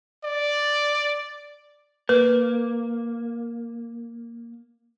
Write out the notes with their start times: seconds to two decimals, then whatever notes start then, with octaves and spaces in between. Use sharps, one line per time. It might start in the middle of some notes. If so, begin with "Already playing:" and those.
0.24 D5
2.09 A#3 B4